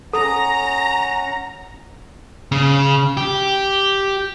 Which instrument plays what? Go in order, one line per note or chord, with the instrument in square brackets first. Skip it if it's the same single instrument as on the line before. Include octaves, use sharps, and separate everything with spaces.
[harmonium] C#4 F#5 [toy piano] A4 [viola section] A#5
[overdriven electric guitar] C#3
G4